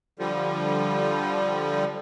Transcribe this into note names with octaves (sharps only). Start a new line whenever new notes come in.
D3 F3 G3